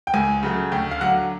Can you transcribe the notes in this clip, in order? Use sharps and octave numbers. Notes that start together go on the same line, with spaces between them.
G5
C#2 G#5
C#3 F#3 A3
D2 G5
F5
D3 F#3 F#5